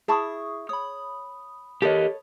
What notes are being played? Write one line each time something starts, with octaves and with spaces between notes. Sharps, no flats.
E4 G#4 A5 B5 C#6 D#6
C#5 B5 D#6
G4 A4 A#4 C#5 D#5